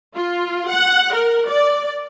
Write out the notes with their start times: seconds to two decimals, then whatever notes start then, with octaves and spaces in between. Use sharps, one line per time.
0.15 F4
0.70 F#5
1.14 A#4
1.49 D5